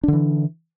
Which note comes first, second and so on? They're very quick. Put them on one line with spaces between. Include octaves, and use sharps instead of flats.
D4 D3 E3